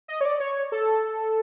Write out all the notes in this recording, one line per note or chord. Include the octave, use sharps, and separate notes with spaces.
D#5
C#5
D5
C#5
A4